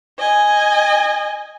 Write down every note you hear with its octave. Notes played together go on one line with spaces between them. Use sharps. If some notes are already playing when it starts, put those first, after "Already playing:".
D#5 G#5